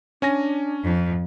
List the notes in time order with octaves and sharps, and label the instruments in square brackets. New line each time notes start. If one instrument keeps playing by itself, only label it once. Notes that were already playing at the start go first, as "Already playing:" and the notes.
[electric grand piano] C#4 G#5 A#6 [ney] D4
[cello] F2